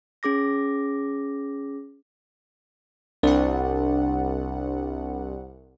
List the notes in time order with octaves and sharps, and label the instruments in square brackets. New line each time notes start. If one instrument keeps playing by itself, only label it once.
[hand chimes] C#4 G#4 D6 A#6
[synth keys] C2 F#5 [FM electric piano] D4